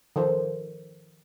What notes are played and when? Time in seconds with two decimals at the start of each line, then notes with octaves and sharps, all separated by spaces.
0.16 D#3 F3 A4 C5